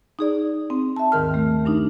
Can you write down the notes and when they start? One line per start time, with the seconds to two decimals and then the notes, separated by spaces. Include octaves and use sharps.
0.19 D#4 G#4 D5
0.70 C4
0.96 E5 A5
1.12 D#2 G#2 D#3 A#4 F6
1.34 A3
1.65 G2 D4 D#4